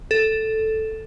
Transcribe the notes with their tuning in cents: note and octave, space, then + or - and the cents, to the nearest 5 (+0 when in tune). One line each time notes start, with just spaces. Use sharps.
A4 +0